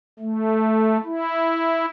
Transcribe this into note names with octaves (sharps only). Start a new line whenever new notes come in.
A3
E4